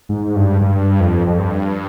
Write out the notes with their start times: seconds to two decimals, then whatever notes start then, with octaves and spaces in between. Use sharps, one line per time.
0.09 G#2
0.36 G2
0.61 G2
1.00 F2
1.27 F2
1.39 G2